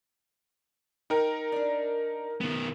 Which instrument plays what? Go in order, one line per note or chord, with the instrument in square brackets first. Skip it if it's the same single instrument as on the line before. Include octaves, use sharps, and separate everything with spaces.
[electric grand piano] D#4 A#4 [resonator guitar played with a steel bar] G5
[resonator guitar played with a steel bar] D4 D5
[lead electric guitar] D#3 B3